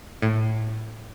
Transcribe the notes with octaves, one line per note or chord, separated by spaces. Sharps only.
A2